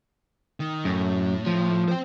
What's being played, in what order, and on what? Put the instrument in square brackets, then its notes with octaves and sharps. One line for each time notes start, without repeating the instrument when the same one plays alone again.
[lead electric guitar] D#3
[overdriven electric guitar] F#2 [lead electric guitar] A2
[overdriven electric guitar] F3
[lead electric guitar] C5 G5